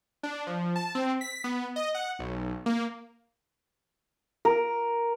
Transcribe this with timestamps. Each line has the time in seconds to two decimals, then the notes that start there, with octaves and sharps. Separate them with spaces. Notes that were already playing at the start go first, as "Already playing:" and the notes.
0.23 D4
0.47 F3
0.76 A5
0.95 C4
1.21 B6
1.44 B3
1.76 D#5
1.95 F#5
2.19 B1
2.66 A#3
4.45 A#4